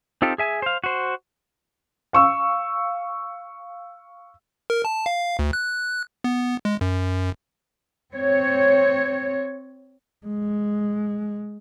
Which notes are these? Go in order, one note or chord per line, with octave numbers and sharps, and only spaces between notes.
C4 D#4 F4 G4 A4
G#4 E5 G#5
C5 F5
F#4 C5
F5 C#6 E6
A#4
A5
F5
D2
F#6
B3
G#3
F#2
C4 C#5
G#3